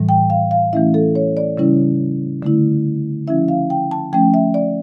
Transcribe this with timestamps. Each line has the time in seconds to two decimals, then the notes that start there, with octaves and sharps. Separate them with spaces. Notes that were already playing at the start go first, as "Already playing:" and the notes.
Already playing: A2 E3 G3
0.09 G5
0.30 F5
0.51 F5
0.73 E3 A3 C#4 E4 E5
0.94 A4
1.15 C#5
1.37 D5
1.57 C#3 G3 C#4 E4
2.42 D3 A3 E4
3.27 F3 C#4 E4 E5
3.48 F5
3.70 G5
3.91 A5
4.13 F3 A3 C#4 G5
4.34 E5
4.54 D5